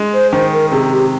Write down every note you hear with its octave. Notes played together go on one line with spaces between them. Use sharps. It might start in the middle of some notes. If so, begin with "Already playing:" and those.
Already playing: G#3
C5
D#3 C5
A#4
C3 G#4
G4